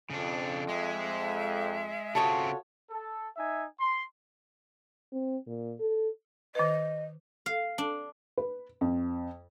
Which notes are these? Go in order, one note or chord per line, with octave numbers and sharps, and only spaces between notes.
F2 C#3 D4
G#3 E5
C#3 C4 F4 F#4 A4 C#5 D#6
A4
D#4 E5 G#5
C6
C4
A#2
A4
D#3 B4 D#5
F5
D4
B4
F2